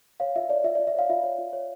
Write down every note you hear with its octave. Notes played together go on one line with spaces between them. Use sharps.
C#5 F5
F4 E5
C#5 D5
F4 E5
F4 D5
E5
C#5 F5
F4 E5
C#5
F4
C#5